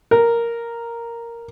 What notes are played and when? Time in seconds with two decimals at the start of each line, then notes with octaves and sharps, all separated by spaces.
0.11 A#4